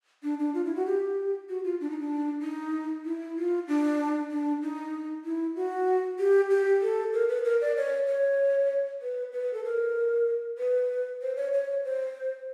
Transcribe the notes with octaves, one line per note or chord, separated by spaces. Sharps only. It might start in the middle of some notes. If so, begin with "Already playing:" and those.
D4
D4
F4
E4
F#4
G4
F#4
F4
D4
D#4
D4
D#4
E4
F4
D4
D4
D#4
E4
F#4
G4
G4
A4
A#4
B4
A#4
D5
C#5
C#5
B4
B4
A4
A#4
B4
C5
C#5
C#5
C5